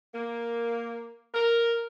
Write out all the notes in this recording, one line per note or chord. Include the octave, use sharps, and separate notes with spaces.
A#3
A#4